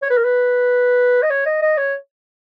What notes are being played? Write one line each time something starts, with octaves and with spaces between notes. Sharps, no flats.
C#5
B4
A#4
B4
D#5
C#5
D#5
D#5
C#5